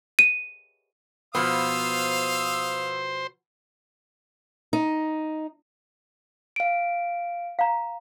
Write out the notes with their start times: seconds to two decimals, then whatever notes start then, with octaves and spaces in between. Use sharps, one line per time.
0.19 D#7
1.35 B2 F3 B3 C5 F5 D#6 E6
4.73 D#4
6.56 F5 D7
7.59 F5 A#5